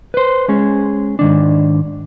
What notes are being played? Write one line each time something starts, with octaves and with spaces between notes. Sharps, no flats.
B4 C5
G#3 C#4 G#4
G#2 D#3 D4